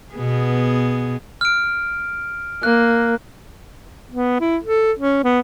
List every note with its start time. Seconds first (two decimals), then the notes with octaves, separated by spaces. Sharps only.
0.14 B2 B3 G#4
1.41 F6 D7
2.63 A#3 F#6
4.11 B3
4.41 E4
4.64 A4
4.99 C#4
5.24 B3